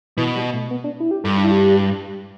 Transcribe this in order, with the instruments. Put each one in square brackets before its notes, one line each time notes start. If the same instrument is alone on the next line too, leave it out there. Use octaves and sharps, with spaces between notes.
[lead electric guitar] B2 [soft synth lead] E3
[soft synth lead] G3
A3
B3
D4
E4
G4
[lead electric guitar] G2 [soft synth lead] A4
[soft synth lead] D4
E4
G4